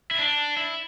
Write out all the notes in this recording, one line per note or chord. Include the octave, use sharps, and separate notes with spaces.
E4
D4
E4